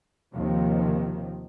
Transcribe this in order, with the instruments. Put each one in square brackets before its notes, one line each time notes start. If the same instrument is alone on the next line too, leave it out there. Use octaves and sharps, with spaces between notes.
[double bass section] D#2 C3 D#3 F3